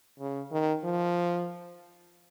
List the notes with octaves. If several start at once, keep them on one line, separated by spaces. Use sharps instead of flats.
C#3
D#3
F3